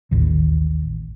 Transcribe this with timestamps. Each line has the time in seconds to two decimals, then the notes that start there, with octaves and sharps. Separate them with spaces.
0.11 A1 D#2